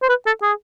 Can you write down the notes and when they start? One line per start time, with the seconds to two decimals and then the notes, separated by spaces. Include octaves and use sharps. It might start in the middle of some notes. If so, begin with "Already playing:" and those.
0.02 C5
0.09 B4
0.26 A4
0.42 G#4